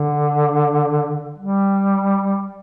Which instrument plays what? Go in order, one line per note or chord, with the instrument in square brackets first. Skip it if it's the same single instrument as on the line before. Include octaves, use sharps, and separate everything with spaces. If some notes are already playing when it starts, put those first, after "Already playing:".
Already playing: [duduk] D3
G3